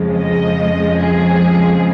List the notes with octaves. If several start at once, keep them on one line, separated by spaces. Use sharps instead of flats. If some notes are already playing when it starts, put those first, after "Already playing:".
Already playing: F2 C#3 F3 G#3
D#5
G#4